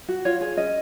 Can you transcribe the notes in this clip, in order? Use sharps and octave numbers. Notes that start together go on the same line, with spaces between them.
F#4
F4 C#5
G#4
C#4 D#5